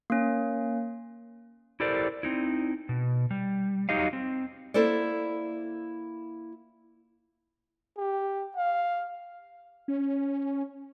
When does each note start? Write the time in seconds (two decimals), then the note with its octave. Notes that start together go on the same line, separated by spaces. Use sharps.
0.10 A#3 C#4
1.80 E4 G4 A4 A#4 C5 D5
2.23 C4 D#4 E4
2.89 B2
3.31 G3
3.89 F#3 D#4 G4 D#5 F5
4.13 C4
4.74 A#3 E4 A4 C5 D5
7.97 G4
8.56 F5
9.88 C#4